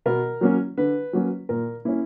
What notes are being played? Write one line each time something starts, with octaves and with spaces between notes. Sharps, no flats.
B2 A#4
F#3 A#3 C#4
D3 B4
F#3 A#3 C#4
A#2 A#4
A#3 C#4 E4